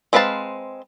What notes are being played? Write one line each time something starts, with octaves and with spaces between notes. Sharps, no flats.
G#3 C4 B4 F5 A5